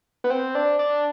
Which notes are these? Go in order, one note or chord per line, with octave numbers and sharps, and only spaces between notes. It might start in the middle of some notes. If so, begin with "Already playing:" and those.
B3
C4
D4
D4